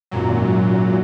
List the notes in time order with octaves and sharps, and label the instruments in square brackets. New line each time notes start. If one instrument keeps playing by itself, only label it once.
[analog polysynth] G#1 F#2 A#2 F#3